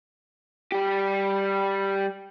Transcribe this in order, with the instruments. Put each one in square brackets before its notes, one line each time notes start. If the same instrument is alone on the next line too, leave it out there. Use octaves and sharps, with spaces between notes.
[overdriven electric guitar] G3 G4